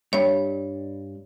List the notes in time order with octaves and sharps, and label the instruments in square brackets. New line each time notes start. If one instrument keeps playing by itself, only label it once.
[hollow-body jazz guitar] G2 G3 [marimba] C#5